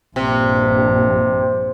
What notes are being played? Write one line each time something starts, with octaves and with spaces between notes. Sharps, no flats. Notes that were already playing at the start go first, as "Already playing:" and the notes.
A#1 G2 C3